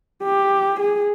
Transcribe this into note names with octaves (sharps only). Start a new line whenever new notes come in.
G4
G#4